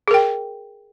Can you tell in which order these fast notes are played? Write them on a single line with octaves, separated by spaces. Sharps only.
G#4 A#4 G5